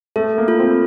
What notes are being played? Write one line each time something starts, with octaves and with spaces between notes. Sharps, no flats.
A3 A4
A#3
F4
C4